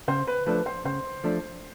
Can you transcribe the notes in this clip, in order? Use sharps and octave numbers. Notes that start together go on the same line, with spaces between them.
C#3 C5
B4
F3 A3 D4 B4
C5
C#3 C5
F3 A3 D4